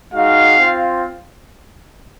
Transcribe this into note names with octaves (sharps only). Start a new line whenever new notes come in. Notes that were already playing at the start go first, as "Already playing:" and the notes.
G#3 D#4 F#4 F5
C4 F4